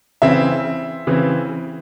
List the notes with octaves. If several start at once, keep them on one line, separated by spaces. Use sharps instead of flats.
C#3 E3 C4 E5
C#3 E3 C4